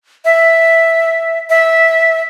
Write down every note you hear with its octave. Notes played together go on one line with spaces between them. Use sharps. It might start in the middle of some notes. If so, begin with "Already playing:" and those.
E5
E5